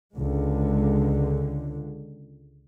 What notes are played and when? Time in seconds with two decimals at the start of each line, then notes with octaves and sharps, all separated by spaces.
0.13 C#2 D3 G#3